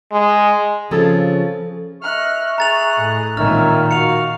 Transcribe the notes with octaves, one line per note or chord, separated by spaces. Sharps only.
G#3
C#3 F3 C4 G#4 A4
D#5 E5 C#6 F6 F#6
G#4 A#5 F#6 A6 F7
A2
A#2 D#3 G#3 C4 C#4 E5 F6
F#4 F5 C#7 F7